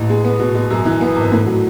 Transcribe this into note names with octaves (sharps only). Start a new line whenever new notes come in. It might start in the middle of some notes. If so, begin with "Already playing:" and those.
Already playing: A1
G#3
B3
B2
B2
F#2
E3
B3
G#1
A2
F#3